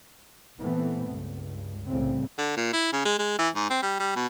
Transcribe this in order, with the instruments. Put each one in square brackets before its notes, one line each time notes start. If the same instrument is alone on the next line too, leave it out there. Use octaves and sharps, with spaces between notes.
[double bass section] A#2 E3 A3 B3 C4
C#2 G2
C2 A2 C#3 C4
[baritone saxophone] D3
A#2
E4
C#3
G#3
G#3
E3
G#2
C4
G3
G3
B2